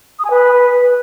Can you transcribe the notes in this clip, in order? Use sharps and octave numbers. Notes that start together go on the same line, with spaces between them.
D#6
G#5
B4